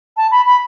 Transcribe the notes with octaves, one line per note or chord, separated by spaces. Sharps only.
A5
B5
B5